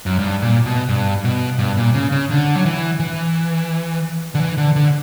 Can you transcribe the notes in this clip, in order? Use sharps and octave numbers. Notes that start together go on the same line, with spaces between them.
F#2
G2
A#2
B2
G2
B2
G2
A#2
C#3
C#3
D3
F#3
E3
E3
D3
E3
D3
D3